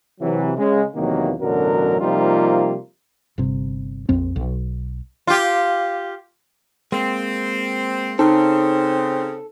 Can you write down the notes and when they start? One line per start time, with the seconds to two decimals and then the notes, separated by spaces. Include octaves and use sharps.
0.21 C3 E3 F#3
0.56 C#3 G#3
0.95 E2 C3 D#3 F#3 A#3
1.40 A1 F#2 B2 D3 F#3 A#4
2.01 C3 F3 G3 A#3 D#4 F4
3.38 G1 C3
4.09 A#1 F2 C4
4.36 B1
5.27 F4 G4
6.92 G#3 A#3 C4
8.19 C#3 C4 D#4 A4